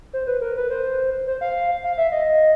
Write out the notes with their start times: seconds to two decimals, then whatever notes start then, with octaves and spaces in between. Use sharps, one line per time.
0.13 C5
0.27 B4
0.41 A#4
0.57 B4
0.70 C5
1.27 C5
1.41 F5
1.84 F5
1.98 E5
2.12 D#5